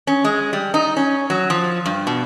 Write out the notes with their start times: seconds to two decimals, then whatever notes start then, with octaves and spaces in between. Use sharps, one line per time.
0.07 C#4
0.24 G#3
0.53 G3
0.74 D#4
0.97 C#4
1.30 F#3
1.50 F3
1.86 G2
2.07 B2